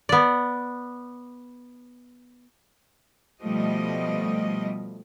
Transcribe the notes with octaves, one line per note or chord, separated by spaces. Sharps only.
B3 D5
B2 F3 G3 A3 D#5